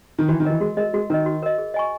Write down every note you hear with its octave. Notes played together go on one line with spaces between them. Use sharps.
D#3
E3 F#4
D#3
E3 A#4 D#5
G#3 F#4
G#3 A#4 D#5
G#3 F#4
D#3 A#4 D#5
F#4
A#4 D#5
G#4
D#5 G#5 C#6